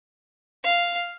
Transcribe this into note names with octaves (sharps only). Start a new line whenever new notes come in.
F5